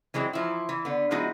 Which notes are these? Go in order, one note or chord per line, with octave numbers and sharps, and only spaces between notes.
E3 F#3 G#3 C4
E3 F3 E4
E3
D3 B3
F3 G#3 B3 D#4 E4 F#4